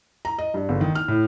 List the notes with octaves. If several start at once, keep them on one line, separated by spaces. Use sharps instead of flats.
A#5
D#5
G2
G1
D#3
F6
A2